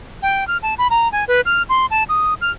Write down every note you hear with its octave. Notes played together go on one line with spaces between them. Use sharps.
G5
F6
A5
B5
A#5
G#5
B4
F6
C6
A5
D#6
F6